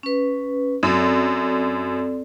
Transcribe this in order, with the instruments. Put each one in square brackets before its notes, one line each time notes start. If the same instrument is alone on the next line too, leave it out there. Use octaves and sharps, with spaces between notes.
[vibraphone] C#4 B4
[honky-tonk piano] F#2 [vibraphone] C4 A4 D5